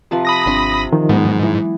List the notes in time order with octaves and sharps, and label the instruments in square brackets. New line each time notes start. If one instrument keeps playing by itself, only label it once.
[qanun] C3 F3 B4
[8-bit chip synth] B5 D#6 A#6
[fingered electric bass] G#1 D4 [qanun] C4 C6
[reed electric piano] D#3 F3
[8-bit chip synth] G#2 [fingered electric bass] F#3 G#3 [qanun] B3
[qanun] E3